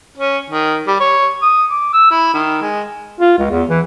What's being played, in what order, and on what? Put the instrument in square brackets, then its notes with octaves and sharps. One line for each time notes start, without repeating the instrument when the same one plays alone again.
[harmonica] C#4
D#3
G3
C#5
D#6
D6
E6
E4
D#3
G#3
[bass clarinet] F4
C#2
E2
E3